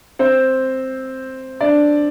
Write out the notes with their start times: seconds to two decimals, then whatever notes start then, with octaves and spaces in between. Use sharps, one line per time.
0.19 C4 C5
1.61 D4 D5